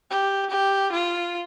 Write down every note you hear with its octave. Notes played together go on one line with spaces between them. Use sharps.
G4
G4
F4